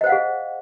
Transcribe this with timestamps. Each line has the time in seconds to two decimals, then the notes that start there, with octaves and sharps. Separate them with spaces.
0.01 D#5
0.04 C5
0.07 F#5
0.09 F5
0.12 G#4